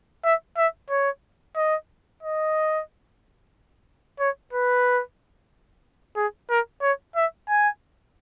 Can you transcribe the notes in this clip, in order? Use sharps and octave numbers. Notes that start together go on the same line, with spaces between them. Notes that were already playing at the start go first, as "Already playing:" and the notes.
E5
E5
C#5
D#5
D#5
C#5
B4
G#4
A#4
C#5
E5
G#5